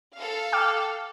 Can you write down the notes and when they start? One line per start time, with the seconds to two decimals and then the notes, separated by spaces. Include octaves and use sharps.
0.15 A4 F5
0.52 G5 D6 F6